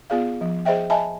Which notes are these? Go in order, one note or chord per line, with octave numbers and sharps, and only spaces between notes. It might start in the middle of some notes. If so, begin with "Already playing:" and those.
B3 F4 G#4 D5 F5
F3
G#4 C5 D#5 E5 G5
D#5 E5 G#5 A5 B5